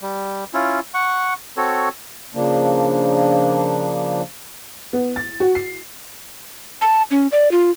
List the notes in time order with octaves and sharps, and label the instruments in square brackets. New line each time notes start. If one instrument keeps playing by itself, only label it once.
[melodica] G3
C#4 E4 F4
F#5 C#6
C4 F#4 A4 C#5
[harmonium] C#3 F3 A#3 D4
[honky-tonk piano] B3
A6
F#4
C7
[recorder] A5
C#4
D5
F4